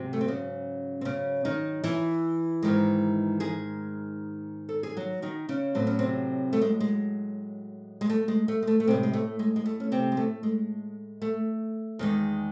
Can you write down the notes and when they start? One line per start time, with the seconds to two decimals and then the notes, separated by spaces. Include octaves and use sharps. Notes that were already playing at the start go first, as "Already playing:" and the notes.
Already playing: G#2 C3 F#3
0.13 A3
0.21 C4
0.28 C#3 C#4
1.01 C4
1.05 C#3 C#4
1.45 D#3 D#4
1.84 E3 E4
2.63 G#2 D#3 G#3
3.40 G#3 G#4
4.69 A4
4.83 G#4
4.97 F#3 F#4
5.22 D#3 D#4
5.49 C#3 C#4
5.75 A2 F#3 C4
5.87 C#4
5.99 C3 C4
6.53 A3
6.61 G#3
6.80 G#3
8.01 G#3
8.10 A3
8.28 G#3
8.48 A3
8.63 G#3
8.67 A3
8.80 A3
8.87 A2 C3 G#3 C4
9.03 G#3
9.13 A3
9.39 G#3
9.56 G#3
9.66 A3
9.80 C#4
9.92 C3 C4
10.12 G#3
10.17 A3
10.43 G#3
11.22 A3
11.99 E2 D#3 G#3